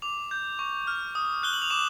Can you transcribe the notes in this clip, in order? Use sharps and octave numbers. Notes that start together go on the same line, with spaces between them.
D6 F7
G6
C#6
F6
D#6
F#6 G7
F#7
F7
D6 E7